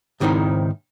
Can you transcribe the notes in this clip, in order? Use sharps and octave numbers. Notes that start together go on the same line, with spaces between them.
C#2 G#2 D#3 C4 D#4 E4